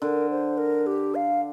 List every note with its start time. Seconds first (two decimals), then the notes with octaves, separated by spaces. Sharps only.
0.01 D3 A#4
0.30 C5
0.58 A#4
0.86 G4
1.15 F5